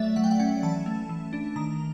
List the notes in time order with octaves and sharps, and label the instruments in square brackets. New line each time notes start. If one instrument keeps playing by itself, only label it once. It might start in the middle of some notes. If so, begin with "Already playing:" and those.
Already playing: [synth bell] F#3 A3 D5 E5
F#3 F#5
G5
F#5
C#4 G5
E3 A5
A3
E3
D4
D#3 A#5